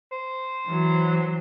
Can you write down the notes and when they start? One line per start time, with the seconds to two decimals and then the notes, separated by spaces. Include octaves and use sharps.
0.12 C5
0.66 E3 F#3